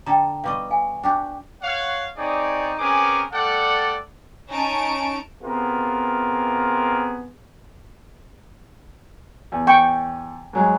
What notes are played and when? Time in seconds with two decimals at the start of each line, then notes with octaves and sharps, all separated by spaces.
0.06 D3 A4 G5 A#5
0.44 B2 G3 D#5 F5 C#6
0.70 F5 G#5
1.03 D4 F#4 G4 G5
1.62 C#5 F5 F#5
2.16 C4 D#4 G#4 C#5 D5
2.78 C4 C#4 G#4 A#4 B4 D6
3.32 G3 A3 A4 D5 F#5
4.49 C#4 D#4 A5 C#6 D7
5.43 C3 B3 F4 G#4 A#4
9.52 E2
9.67 G5 C#6
10.53 G#2 F#3 G#3